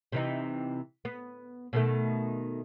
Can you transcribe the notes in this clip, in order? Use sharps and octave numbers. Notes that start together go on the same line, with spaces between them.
C3 E3 D#4
B3
B2 D#3 A3